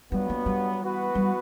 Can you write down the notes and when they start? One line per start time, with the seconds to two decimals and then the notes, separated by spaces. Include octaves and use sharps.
0.12 G2 F#3 G3 B3
0.30 A#3
0.46 G3
0.81 E3 B3 F#4 B4
1.15 G3